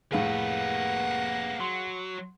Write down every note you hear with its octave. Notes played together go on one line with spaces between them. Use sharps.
F1 A2 A#3 G#4 B4 F5 F#5
F#3 C6